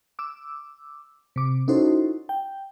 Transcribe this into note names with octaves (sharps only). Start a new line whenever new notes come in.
D6 E6
C3 D6
C#4 D#4 E4 F#4 A4 C5
G5